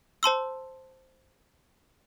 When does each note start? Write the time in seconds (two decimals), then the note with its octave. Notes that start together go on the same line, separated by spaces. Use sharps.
0.23 C5 A5 C6 E6